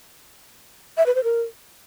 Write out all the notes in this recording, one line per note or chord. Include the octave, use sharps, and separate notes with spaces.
E5
B4
C5
A#4